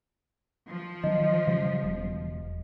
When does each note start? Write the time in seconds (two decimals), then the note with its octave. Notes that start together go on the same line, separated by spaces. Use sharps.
0.69 F3
1.04 D#3 F#3 D#5
1.47 C#3 G3
1.84 E1